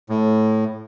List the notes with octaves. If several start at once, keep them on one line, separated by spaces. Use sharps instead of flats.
A2